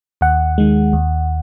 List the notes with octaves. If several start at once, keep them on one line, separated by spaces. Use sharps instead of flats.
D#2 F#5
D#3 G#3
D#2